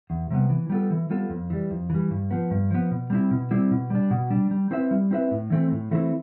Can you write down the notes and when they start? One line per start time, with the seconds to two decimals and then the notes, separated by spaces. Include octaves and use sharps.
0.10 E2
0.31 C3 G3 B3
0.50 E3
0.69 G3 B3 F4 A4
0.91 E3
1.10 G3 B3 F4 A4
1.30 F2
1.50 E3 G3
1.71 F2
1.90 E3 G3
2.10 G2
2.31 F3 B3
2.51 G2
2.71 F3 B3
2.91 B2
3.10 G3 C4 E4
3.31 B2
3.51 G3 C4 E4
3.71 B2
3.90 G3 D4
4.11 B2
4.30 G3 D4
4.51 G3
4.71 C4 E4 B4 E5
4.91 G3
5.11 C4 E4 B4 E5
5.31 A2
5.50 E3 A3 C4 E4
5.71 A2
5.91 E3 A3 C4 E4